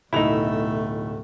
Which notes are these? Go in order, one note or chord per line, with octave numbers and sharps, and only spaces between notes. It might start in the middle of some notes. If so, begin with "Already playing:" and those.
D1 B2 A3 D#4 E4 F7